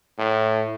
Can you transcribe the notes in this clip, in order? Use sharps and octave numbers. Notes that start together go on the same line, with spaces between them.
A2